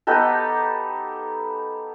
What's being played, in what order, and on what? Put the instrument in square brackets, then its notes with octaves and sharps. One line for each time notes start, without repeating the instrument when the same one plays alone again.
[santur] B3 D#4 G4 A4